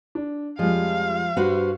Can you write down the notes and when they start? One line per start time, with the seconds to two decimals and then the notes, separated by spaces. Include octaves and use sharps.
0.15 D4
0.59 F2 F3 G3 G#3 F5
1.37 G2 F#4 B4 C5